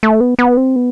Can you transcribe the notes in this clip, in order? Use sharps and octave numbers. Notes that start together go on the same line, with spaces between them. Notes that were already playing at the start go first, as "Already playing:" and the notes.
A3
B3
B3
C4
B3